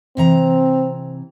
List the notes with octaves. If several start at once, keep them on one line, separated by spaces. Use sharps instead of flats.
C3 E3 C4 A#5